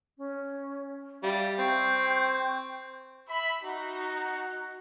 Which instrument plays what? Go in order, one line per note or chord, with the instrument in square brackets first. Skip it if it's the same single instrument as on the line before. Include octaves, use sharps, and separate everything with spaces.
[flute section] C#4
[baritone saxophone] G3 [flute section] E5 F5
[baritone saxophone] C4 [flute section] G5 C#6 G6
[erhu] E5 [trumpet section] B5
[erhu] D#4 [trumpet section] F#4